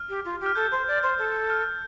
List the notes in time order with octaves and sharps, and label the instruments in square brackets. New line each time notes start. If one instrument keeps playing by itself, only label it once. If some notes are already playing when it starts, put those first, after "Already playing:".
Already playing: [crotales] F6
[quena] G4
F4
G4
[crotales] F6
[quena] A4 [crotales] G6
[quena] C5
D5
C5
A4
[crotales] F6